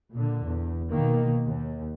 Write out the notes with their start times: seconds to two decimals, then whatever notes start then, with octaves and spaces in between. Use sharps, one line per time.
0.13 A#2 D3
0.46 E2
0.90 B2 D#3 A#3
1.44 D#2